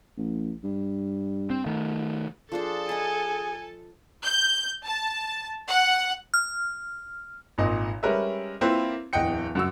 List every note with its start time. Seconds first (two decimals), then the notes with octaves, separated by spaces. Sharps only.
0.17 A1
0.64 G2
1.50 C4
1.66 D#3 A3
2.52 F3 D4 G#4 A4 C5 A5
2.89 B4 D#5 G#5
4.24 G6
4.85 A5
5.69 F#5
6.34 F6
7.58 G#1 A#2 D#5
8.03 G3 G#3 C#4 A#4 B4 E5
8.61 A#3 C4 E4 F4 B4 C5
9.13 D1 E2 D#5 F#5 G5 C#7
9.55 F#2 F#4 E6